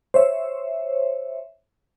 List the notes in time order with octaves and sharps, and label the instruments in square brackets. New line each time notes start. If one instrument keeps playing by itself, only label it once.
[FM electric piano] C5 C#5 E5